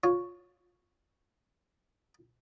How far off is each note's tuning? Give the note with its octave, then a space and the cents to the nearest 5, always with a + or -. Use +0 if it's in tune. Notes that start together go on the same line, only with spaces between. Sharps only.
F4 +20 C#5 +0